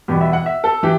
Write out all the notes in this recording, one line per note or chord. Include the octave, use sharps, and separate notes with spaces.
E2 B2 G3 B3 G4
E5
F#5
E5
A4
E3 G4